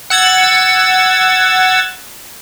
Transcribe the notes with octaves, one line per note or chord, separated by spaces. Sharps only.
F#5 E6 G#6 A6